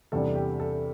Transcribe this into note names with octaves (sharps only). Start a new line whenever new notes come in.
E2 C3 G3 D4 A4
G4
A4